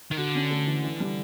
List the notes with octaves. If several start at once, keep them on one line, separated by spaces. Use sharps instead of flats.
D#3
D3 F#4
C#4
A3
E3
E3
G3